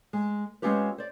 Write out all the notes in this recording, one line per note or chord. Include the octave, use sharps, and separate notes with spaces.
G#3
G#3 C4 C#4 F4 G4 B4
C5 D5